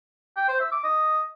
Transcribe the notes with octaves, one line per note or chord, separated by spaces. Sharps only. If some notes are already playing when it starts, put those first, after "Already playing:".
G5
C5
E5
D6
D#5